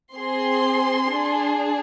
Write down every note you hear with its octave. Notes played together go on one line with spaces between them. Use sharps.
C4 G#4 C6
D4 G#4